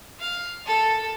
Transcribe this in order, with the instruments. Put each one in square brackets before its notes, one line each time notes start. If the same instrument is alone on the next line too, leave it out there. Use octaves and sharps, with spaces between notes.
[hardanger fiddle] F5
A4